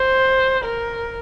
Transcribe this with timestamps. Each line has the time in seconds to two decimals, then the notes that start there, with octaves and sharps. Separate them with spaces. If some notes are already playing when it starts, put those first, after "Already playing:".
Already playing: C5
0.64 A#4